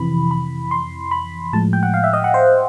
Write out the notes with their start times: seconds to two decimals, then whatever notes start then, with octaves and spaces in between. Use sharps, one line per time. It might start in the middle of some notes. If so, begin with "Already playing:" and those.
Already playing: F2 C3 E3 B5
0.31 B5
0.71 C6
1.11 B5
1.53 A2 F3 G#3 A5
1.73 G5
1.83 F#5
1.94 F5
2.04 E5
2.13 D#5
2.24 F#5
2.34 C5